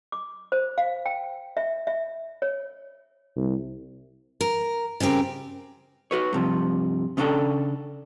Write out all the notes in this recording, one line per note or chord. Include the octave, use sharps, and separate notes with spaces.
D6
C5
F5
G5
E5
E5
C#5
C2
A#4
C#3 G3 C4 G4 A#4
F#4 B4 C#5
G2 C3 F3
C#3 C#4 D4 E4 A4 G5